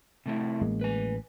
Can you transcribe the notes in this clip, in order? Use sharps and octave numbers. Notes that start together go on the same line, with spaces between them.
C3 A3 E4
A1 G#3 A#3
B4 G#5